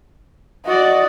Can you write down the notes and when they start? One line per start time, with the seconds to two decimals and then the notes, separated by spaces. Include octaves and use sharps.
0.66 F#4 D5 D#5